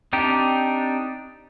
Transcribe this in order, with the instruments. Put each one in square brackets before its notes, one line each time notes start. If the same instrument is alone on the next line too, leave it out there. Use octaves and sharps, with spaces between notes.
[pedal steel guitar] C4 D4 D#4 G4